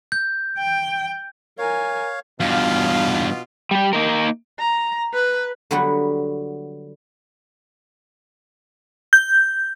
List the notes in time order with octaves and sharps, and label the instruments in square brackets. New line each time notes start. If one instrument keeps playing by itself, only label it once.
[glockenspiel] G6
[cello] G5
[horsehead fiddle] A#4 G#5 [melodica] C#5 F5
[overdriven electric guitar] E2 G2 [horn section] B2 F4 [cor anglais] F5
[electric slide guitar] G3 G4
A#3 D#4 A#4
[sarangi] A#5
B4
[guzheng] D3 F#3 G3 B3 F#4 B4
[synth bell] G6